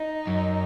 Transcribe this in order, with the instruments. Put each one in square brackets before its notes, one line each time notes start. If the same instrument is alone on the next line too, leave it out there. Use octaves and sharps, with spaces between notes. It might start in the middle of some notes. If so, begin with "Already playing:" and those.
Already playing: [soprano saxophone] D#4
[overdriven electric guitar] F#2